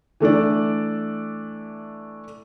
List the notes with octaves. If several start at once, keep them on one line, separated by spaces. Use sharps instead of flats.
E3 A3 D4 D5